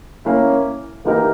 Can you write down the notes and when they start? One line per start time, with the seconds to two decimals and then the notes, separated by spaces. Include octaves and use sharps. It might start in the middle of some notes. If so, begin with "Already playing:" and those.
0.25 A#3 C#4 E4
1.05 E3 A#3 D#4 G4 A#4